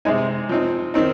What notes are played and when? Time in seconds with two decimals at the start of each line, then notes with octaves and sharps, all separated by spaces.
0.05 C3 G#3 D#4 G#5
0.49 F3 C4 D#4
0.94 D#3 C4 D#4